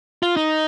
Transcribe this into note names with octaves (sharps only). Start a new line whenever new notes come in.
F4
D#4